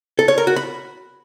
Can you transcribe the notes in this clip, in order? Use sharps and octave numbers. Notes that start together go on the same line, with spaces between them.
A4
C#5
A#4
F#4
B5